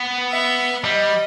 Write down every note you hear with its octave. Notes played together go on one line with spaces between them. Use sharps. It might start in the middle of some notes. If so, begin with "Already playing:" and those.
Already playing: B3
E5
G3 D#5